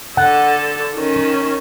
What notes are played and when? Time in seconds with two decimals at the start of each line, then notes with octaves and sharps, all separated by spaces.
0.17 D3 A4 F#5
0.95 D#3 C#4